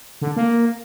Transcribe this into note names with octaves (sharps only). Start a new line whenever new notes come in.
D3
A#3